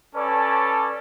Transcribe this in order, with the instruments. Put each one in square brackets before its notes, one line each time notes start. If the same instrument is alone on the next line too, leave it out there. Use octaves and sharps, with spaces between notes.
[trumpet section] C#4 A4 B4 C#5 D5 A5